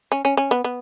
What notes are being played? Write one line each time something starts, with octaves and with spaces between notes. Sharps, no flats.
C#4
C#4
C#4
B3
B3